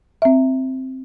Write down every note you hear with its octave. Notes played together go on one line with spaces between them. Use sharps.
C4 E5